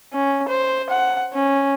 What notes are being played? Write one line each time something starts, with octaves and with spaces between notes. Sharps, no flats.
C#4
C5
F#5
C#4